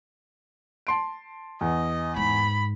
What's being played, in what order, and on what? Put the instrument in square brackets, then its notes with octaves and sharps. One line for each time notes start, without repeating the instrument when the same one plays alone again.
[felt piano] A5 C6 D7
[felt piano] E2 [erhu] D#5
[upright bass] G#2 [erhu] B5